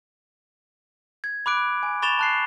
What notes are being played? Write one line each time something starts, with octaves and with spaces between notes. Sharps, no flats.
G#6
B5 D6 F#6 D7
G#5
B5 C#6 A6 E7 F7 G7
A5 F#6 C7